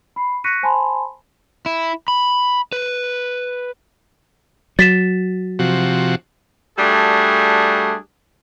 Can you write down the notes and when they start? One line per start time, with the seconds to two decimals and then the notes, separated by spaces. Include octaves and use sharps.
0.16 B5 C7
0.44 C#6 F#6 A#6 B6 C#7 D#7
0.63 C5 G#5 A5 B5 C6
1.66 E4
2.08 B5
2.72 B4
4.79 F#3 A6 B6 E7
5.59 C3 F3 F#4
6.79 G3 A3 D4 F#4 G#4